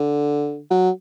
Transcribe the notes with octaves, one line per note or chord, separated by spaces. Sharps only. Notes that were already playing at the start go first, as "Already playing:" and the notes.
Already playing: D3
F#3